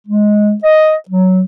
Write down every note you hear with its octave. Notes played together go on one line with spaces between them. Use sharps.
G#3
D#5
F#3